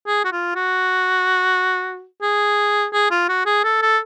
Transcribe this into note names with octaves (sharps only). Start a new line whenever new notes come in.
G#4
F#4
F4
F#4
G#4
G#4
F4
F#4
G#4
A4
A4